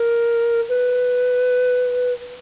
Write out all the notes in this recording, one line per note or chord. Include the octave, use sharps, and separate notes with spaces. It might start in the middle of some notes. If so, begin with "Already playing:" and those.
Already playing: A#4
B4